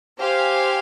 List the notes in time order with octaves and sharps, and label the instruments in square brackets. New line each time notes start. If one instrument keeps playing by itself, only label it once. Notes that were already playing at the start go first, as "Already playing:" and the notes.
[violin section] G4 C5 F5 G#5